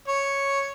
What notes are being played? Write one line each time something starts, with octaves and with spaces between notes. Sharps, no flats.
C#5